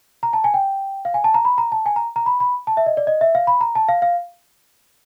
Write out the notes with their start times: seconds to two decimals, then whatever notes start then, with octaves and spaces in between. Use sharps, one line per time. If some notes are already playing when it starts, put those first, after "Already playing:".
0.23 A#5
0.33 A5
0.44 G#5
0.54 G5
1.05 F5
1.14 G#5
1.24 A5
1.34 A#5
1.45 B5
1.58 A#5
1.72 A5
1.86 G#5
1.96 A#5
2.16 A#5
2.26 B5
2.40 B5
2.67 A5
2.77 E5
2.86 D#5
2.97 D5
3.07 D#5
3.21 E5
3.35 F5
3.47 B5
3.61 A#5
3.75 A5
3.89 F5
4.02 F5